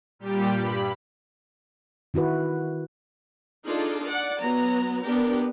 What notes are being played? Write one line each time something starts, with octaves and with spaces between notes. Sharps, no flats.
A#2 G3 G4
G2 B5
D#3 E4 F#4 B4
D4 D#4 F4 G#4 A4 D5
D5 F#5
F#3 B3 A#5
B3 D4 G4 A#4